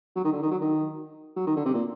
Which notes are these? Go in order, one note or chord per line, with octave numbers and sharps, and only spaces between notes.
F#3
D#3
D3
D#3
F#3
D#3
F#3
D#3
D3
C3
A#2